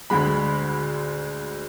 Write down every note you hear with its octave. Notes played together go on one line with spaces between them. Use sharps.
D2 D3 G#3 B5